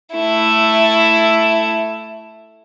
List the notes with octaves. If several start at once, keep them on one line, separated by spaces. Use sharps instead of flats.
A3 E4